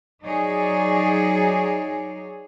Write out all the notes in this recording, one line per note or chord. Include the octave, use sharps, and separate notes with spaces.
F#3 D#4 G#4 C#5 D5